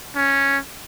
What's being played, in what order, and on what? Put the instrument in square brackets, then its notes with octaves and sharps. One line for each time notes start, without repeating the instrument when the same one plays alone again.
[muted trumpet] C#4